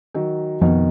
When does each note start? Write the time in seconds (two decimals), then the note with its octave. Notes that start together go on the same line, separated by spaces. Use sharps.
0.15 D#3 F#3
0.61 F2 B2 D#3 F3 B3